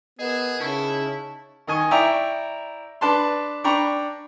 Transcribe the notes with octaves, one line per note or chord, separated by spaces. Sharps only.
B3 G#4 A#4 D#5
C#3 D#4 E4 A5 C#6
D#3 D#5 G#5 C#6
E4 D5 E5 G5 A#5 C#6
D4 B4 A5 C6
D4 G5 A#5 B5 C#6